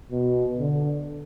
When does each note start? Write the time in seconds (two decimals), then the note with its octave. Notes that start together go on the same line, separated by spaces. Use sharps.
0.11 B2
0.59 D3